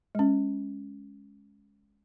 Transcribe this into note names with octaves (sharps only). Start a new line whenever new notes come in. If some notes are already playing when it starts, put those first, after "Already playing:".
G#3 C#4